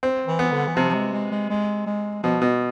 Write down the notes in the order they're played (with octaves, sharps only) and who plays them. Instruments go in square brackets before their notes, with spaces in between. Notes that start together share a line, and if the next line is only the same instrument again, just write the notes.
[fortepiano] C4
[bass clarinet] E3
[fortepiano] B3
[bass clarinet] D3
E3
[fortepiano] C3 [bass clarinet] F3
[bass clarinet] F3
G#3
G#3
G#3
G#3
G#3
[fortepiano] B2 [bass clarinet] F3
[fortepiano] B2